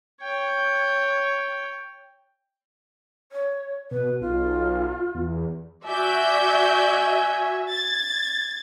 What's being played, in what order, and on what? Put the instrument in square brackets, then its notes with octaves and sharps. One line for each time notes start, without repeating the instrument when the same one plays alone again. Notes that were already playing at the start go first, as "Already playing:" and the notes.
[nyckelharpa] C#5 G5
[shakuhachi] C#5
[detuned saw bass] B2 [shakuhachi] B4
[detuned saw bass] B1 [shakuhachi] F4
[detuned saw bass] E2
[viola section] F#4 E5 [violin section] D5 G6 [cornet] G#5
[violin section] G#6 A6